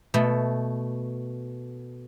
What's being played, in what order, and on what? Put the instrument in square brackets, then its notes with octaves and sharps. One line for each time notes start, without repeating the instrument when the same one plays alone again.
[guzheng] B2 A3